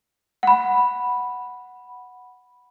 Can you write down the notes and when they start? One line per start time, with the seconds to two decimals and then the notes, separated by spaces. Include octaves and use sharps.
0.43 F#5 B5